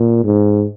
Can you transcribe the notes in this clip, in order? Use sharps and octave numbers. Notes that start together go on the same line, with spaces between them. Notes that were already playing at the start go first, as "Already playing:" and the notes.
Already playing: A#2
G#2